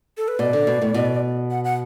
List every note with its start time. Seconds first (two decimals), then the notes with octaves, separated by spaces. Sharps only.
0.17 A4
0.28 B4
0.39 B2 D5
0.53 D3
0.67 B2
0.82 A2
0.94 B2
1.51 F#5
1.64 F#5